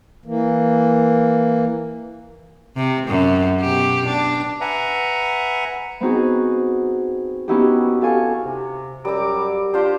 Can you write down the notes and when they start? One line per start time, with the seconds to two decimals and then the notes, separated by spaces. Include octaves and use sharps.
0.25 E3 A#3
2.77 C3
3.07 F#2
3.60 B2 G4
4.06 D4
4.61 B4 E5 F#5 G#5 A#5
6.01 B3 C4 D#4 F#4 G#4
7.48 B3 C#4 D#4 E4 F#4 G4
8.01 G4 A4 F5 G#5 C#6
8.46 C3
9.05 F#2 G3 A#5 D6 E6
9.74 D4 F4 G4 C5